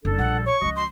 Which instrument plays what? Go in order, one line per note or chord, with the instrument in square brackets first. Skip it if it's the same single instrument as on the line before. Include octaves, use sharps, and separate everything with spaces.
[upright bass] F#1 [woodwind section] G3 D4 A4
[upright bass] A#1 [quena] F#5
[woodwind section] C#5 [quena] C#6
[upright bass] C#2 F3 [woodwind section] F#4 D#5
[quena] C6